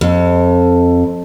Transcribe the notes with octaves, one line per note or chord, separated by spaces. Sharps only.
F2